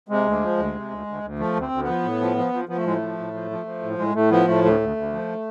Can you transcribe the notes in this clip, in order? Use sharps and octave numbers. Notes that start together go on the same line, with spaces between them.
C3 G#3
D2
F3
D2
C3
D2
D2
D2
F3 A3
D2
C4
D2
F3 B3
A2
F3
F3
F3
F3 B3
A3
A2 G#3
A3
F3
A2
F3
F3
F3
A2
A2 G#3
A2 A3
F3 B3
A2 A3
D2 A3
D2
D2
F3